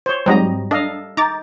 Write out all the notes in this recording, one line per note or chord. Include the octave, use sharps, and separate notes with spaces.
C5 C#5
G#2 F#3 G3 C4 D#5 A#5
D4 A4 D#5 F5
D#4 A#5 D6 A6